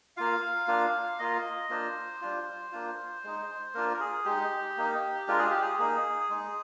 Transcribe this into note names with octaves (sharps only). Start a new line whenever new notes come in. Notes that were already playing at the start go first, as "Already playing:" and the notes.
A#3 F4 F5
A#3 D4 F4
A#3 F4 D#5
A#3 D4 F4 C5
G3 D4 F4
A#3 D4 F4
G#3 D#4
A#3 D4 F4 A#4
A#4
G#4
G#3 D#4 G4
A#3 D#4
G#3 D4 F4 A#4
G#4
G4
G#4
A#3 D#4 G#4
G#3 D#4